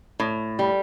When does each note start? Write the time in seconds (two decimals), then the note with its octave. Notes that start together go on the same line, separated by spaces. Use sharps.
0.20 A2
0.59 G3